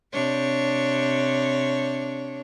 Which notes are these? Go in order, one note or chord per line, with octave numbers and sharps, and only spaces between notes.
C3 D4 C#5